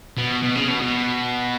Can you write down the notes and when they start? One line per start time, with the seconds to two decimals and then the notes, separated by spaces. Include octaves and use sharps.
0.17 B2
0.43 B2
0.55 C#3
0.68 B2
0.81 B2